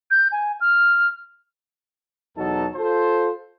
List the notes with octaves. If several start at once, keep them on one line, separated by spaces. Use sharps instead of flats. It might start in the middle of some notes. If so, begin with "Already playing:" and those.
G6
G#5
F6
E2 B2 F#3 D#4 A4 A5
F4 A4 C5